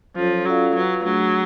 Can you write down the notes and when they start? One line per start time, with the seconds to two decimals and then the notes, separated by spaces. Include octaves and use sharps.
0.16 F3 F#3 C#4 F4 A4 C#5
0.46 F#3 C#4 F4 A4 D5 F5
0.74 F#3 F4 B4 F5
1.04 F#3 A3 D4 G#4